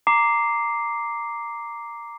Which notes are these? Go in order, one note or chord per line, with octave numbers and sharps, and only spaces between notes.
A#5 D6 C7